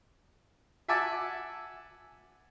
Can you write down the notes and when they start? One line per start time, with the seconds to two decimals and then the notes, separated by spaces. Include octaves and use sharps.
0.88 E5 F#5 G#5 A5 D6 E6